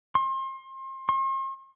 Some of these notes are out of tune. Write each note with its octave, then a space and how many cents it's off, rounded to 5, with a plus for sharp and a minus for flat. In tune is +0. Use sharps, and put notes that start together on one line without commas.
C6 +35
C6 +45